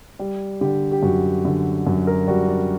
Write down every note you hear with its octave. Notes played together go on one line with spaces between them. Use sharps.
G3
D3 G4
G4
F#2 F#4
D3
F#2 F#4
A#4
G3 F#4
D4